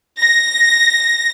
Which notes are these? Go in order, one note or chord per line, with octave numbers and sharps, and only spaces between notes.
A#6